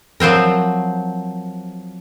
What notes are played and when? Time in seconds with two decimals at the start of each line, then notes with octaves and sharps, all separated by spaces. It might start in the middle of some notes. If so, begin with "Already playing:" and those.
0.20 F3 F#3 C4 A#4